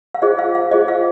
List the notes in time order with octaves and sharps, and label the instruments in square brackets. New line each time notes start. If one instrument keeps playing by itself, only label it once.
[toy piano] F5
F4 G#4 C5 D#5
F5
F5
F4 G#4 C5 D#5
F5